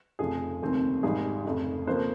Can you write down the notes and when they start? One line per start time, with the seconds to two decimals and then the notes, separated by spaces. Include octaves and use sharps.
0.19 F1 F2 C#3 F3 G#4
0.62 F1 D#2 C#3 G#3 C4
1.03 G#1 G#2 G3 G#4
1.45 F1 F2 C#3
1.87 F2 C#3 F3 A#3 C5